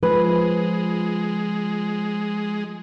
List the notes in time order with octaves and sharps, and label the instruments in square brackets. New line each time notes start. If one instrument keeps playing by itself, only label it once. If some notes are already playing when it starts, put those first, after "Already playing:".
[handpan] F3 [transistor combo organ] G#3 [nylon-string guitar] B4